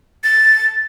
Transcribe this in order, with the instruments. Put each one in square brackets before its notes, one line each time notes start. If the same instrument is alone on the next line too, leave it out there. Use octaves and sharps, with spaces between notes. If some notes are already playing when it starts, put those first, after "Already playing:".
[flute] A6